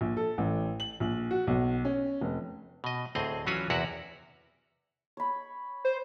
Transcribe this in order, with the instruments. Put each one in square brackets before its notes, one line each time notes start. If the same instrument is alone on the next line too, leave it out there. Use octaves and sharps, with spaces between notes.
[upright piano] A#1
A4
A1
F#7
A#1
F#4
B1
C#4
F1
[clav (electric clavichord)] B2 D#5
D2 A2 C4 G#4 D#5
E3 F#3 C#4 F4 F#4 G#5
E2 C3 E4 F#4 A#4 F#5
[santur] C#5 B5
[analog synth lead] C5